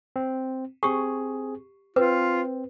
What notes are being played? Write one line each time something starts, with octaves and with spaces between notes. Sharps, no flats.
C4
C4 G4 G#4 C#6
C4 F4 B4